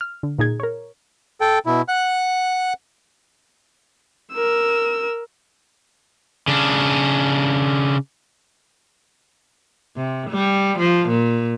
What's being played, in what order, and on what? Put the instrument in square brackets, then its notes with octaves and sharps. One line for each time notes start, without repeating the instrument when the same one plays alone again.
[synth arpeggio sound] F6
D3
A#2 D#4 G#4 G#6
A#4 C#5
[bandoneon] A4 G5
B2 E4
F#5 F#6
[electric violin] A#4 E6
[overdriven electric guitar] C#3 D4
[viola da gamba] C3
G3
F3
A#2